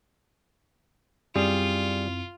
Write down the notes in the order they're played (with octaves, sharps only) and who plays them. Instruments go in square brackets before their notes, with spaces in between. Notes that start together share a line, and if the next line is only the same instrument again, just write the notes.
[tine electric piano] F#2 C4 E4 [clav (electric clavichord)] G3 G#4 [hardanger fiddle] F4